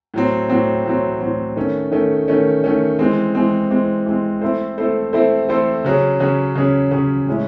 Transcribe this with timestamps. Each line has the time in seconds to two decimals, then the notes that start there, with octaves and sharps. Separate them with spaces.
0.14 A2 F#3 C4
0.49 A2 F#3 C4
0.85 A2 F#3 C4
1.20 A2 F#3 C4
1.56 D#3 A3 C#4
1.92 D#3 A3 C#4
2.28 D#3 A3 C#4
2.64 D#3 A3 C#4
2.99 E3 G#3 C4
3.35 E3 G#3 C4
3.71 E3 G#3 C4
4.06 E3 G#3 C4
4.41 A3 C4 E4 A4 C5
4.78 A3 C4 E4 A4 C5
5.13 A3 C4 E4 A4 C5
5.49 A3 C4 E4 A4 C5
5.84 C#3 F#3 C#4 G#4
6.20 C#3 F#3 C#4 G#4
6.55 C#3 F#3 C#4 G#4
6.91 C#3 F#3 C#4 G#4
7.27 A2 G#3 C#4 E4